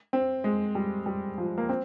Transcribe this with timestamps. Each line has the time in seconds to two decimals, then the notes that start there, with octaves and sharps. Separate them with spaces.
0.13 C4
0.44 G#3
0.75 G3
1.06 G3
1.38 F3
1.58 A#3
1.69 C4